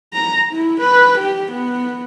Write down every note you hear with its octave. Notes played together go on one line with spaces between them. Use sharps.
A#5
E4
B4
G4
B3